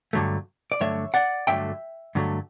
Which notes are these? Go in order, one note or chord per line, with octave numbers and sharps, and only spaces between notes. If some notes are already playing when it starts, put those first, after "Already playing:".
G2 D3 F#3 A3
D5
G2 D3 F#3 A3 C#5 E5
D5 F#5
G2 D3 F#3 A3 E5 G5
G2 D3 F#3 A3